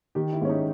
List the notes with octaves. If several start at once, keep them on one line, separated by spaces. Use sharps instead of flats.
D#3 G4
E4
G#2 C#4
D#4